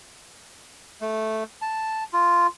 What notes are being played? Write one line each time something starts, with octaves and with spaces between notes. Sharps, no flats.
A3
A5
F4